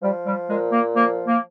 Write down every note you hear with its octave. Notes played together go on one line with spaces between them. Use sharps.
F3 G3
G3
A#2 G#3
A#3
F3 A#3
A#3